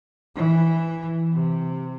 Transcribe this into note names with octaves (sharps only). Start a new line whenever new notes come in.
E3
C3